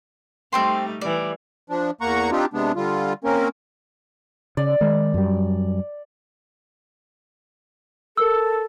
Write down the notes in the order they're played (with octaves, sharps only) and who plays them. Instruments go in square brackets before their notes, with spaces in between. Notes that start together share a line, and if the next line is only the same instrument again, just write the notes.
[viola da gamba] G3 A3 D#4 [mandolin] C4 G5 C6
[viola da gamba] E3 G3 [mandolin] D5
[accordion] F3 D4
E2 A#3 F#5 A#5 C#6
C4 D4 D#4 F4 G4
C3 G#3 B3 D4
D3 G3 F4
A#3 C4 C#4 A#4
[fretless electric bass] C#3 [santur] D5
[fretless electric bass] D#3 G#3
F#2 G3
[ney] A4 [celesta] A#4 E6